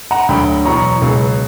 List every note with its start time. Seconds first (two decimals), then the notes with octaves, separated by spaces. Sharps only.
0.11 F#5 A#5
0.29 D2 D3 F#3 G5 B5
0.65 E2 B2 F#3 A#5 C#6
1.02 C#2 B2 F#3